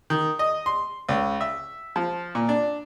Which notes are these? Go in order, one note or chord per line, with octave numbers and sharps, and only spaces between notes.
D#3
D#5
C6
C#2
E5
F3
A#2
D4